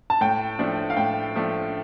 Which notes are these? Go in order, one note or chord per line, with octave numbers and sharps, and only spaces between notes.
A5
A2 G5
F3 A3 D4
F5
A2 G5
F3 A3 D4